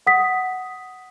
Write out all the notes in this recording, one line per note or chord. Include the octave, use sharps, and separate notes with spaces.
F#5 D#6 B6